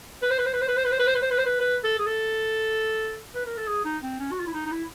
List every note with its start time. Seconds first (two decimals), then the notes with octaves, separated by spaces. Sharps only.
0.23 B4
0.30 C5
0.38 B4
0.46 C5
0.53 B4
0.61 C5
0.68 B4
0.77 C5
0.84 B4
0.92 C5
0.99 B4
1.07 C5
1.15 B4
1.22 C5
1.30 B4
1.38 C5
1.45 B4
1.61 B4
1.84 A4
1.99 G#4
2.06 A4
3.35 B4
3.46 A#4
3.57 A4
3.68 G#4
3.85 D#4
4.03 C4
4.20 C#4
4.32 F#4
4.40 F4
4.47 E4
4.54 D#4
4.66 D#4
4.72 E4